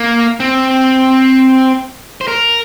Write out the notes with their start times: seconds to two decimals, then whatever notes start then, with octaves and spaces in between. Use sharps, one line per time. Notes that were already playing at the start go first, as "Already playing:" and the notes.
Already playing: A#3
0.40 C4
2.21 C5
2.28 A#4